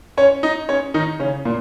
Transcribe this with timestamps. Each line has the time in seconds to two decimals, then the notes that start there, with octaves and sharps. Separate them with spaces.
0.17 C#4 C#5
0.43 D#4 D#5
0.69 C#4 C#5
0.94 D#3 D#4
1.19 C#3 C#4
1.45 A#2 A#3